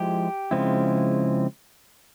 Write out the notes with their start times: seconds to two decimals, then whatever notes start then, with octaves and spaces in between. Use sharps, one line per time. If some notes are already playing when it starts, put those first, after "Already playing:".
Already playing: F3 G#3 E4 G4
0.51 C#3 F3 G#3 C4 E4